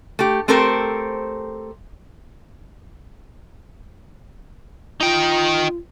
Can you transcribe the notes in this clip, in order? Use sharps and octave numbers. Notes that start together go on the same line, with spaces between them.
A3 G4
A3 C4 G4 A4 A#4 C5
D#4 F4 G5